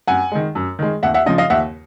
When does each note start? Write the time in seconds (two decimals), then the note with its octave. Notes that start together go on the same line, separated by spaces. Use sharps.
0.08 F#2 F#5 G#5
0.32 D#3 G#3
0.55 F#2
0.79 D#3 G#3
1.03 D#2 E5 F#5
1.14 E5 F#5
1.26 C#3 F3 D#5
1.38 D#5 F5
1.50 D#2 E5 F#5